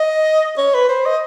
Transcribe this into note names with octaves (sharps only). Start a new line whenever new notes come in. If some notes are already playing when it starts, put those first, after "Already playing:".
Already playing: D#5
C#5
B4
C5
D#5